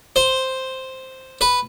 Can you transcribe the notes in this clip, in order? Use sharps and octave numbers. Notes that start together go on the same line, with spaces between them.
C5
B4